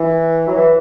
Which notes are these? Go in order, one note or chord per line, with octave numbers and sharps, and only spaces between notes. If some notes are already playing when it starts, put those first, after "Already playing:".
Already playing: E3
F#3
E3